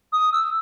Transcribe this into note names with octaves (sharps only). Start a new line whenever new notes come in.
D#6
E6